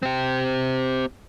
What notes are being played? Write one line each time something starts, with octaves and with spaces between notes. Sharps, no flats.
C4 G4